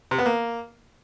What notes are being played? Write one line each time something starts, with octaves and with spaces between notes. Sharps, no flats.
C3
B3
A#3